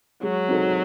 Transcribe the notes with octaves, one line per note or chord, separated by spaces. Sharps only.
F#3 G#3
C4 D#4 F#4 A4